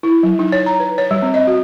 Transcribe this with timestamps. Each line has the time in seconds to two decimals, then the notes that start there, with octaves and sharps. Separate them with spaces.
0.03 E4
0.23 F#3
0.39 D#4
0.52 C#5
0.66 A#5
0.80 B4
0.98 C#5
1.11 G3
1.22 C4
1.34 D#5
1.47 F#4